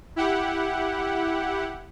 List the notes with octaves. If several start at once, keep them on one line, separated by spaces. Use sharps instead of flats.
E4 G4 F#5